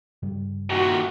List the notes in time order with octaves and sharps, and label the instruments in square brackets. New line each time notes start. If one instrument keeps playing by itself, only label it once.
[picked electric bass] G2 C#3 G3
[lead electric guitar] D#2 A#2 [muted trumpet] F#4